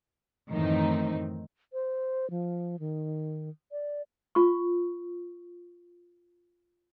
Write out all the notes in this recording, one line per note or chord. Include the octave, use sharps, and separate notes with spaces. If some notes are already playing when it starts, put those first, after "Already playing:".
F#2 A2 D#3 E3 C4 D#4
C5
F3
D#3
D5
F4 C#6